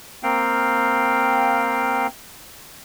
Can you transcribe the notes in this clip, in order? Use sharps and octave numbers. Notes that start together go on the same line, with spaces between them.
A#3 C4 F5 G5